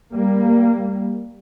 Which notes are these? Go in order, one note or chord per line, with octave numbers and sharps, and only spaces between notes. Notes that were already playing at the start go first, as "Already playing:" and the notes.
G3 A#3